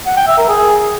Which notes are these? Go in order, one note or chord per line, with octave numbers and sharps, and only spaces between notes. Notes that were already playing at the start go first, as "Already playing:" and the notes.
F#5
G5
E5
A#4
G#4